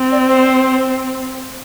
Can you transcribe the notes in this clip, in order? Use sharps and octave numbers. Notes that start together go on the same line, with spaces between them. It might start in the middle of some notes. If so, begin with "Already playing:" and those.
Already playing: C4
D5
C5